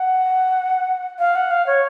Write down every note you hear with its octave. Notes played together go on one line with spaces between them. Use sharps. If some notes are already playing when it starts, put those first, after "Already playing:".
Already playing: F#5
F5
F#5
F5
C#5